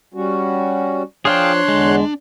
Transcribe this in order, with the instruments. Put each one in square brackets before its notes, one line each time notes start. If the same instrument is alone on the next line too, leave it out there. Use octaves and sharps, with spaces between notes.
[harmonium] G3 C#4 F#4
[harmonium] F3 [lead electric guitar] D4 [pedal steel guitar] G#4 F5 G5 [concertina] C#5 C6 F#6
[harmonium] E2 D3 [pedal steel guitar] G#3